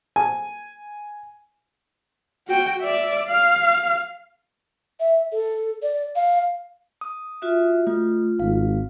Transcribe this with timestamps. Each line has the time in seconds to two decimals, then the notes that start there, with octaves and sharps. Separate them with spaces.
0.16 G#5
2.48 F#4 G5
2.81 D5 E5
3.27 F5
5.00 E5
5.32 A4
5.82 D5
6.16 F5
7.01 D#6
7.42 F4 F#4 E5
7.87 A3 F4
8.40 G#1 F5